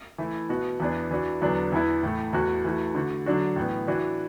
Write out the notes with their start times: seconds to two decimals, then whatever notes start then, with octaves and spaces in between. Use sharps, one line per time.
0.18 E3 A3 E4
0.49 B2 B3 F#4
0.80 E2 E3 B3 D4
1.11 E3 D4 F#4
1.42 E2 D3 F#3 B3 D4
1.72 E2 E3 B3 E4
2.03 A2 E3 A3
2.33 E2 E3 A3 F#4
2.65 E3 A3 F#4
2.95 D3 A3 F#4
3.26 D3 F#3 D4 F#4
3.56 A2 E3 B3
3.87 E3 D4 F#4